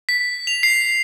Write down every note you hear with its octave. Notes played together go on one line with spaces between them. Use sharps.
B6
F7
C7